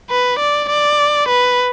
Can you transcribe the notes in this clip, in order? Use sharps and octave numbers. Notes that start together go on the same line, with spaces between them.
B4
D5
D5
B4